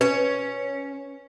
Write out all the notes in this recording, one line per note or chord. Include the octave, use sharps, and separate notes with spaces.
C#4 B4